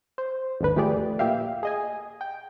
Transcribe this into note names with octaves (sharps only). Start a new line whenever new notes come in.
C5
G#1 D#2 D3 B4
F3 A3 G4 G#4 D5
A#2 G4 E5 F5
G#4 D#5 G#5
G5